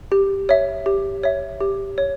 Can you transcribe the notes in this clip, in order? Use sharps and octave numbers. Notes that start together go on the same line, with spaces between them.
G4
C#5 E5
G4
C#5 E5
G4
C#5